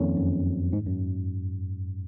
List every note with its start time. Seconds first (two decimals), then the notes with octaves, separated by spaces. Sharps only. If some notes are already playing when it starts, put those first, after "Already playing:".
Already playing: F2 D#3 A#3 C#4
0.17 F#2
0.73 G#2
0.86 F#2